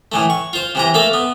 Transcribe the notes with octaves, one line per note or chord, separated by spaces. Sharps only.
A2 E3 A3
C#6
F4 C5
C3 E3 A#5
A3 A#3 A4 E5
B3